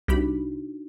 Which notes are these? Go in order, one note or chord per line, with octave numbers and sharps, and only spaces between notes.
C2 D4 D#4 F#4 G4 B5